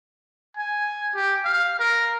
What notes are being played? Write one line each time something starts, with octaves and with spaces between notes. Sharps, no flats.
G#5
G4
F5
A#4